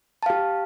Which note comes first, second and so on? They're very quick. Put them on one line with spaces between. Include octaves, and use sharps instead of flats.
A5 F5 G4